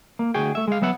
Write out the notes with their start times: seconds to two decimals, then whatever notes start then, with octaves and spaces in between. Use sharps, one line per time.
0.19 A#3
0.34 D2 F#4 G#4 G5
0.55 A3 E5
0.68 G#3 F5
0.82 F#3 B3 E5 F#5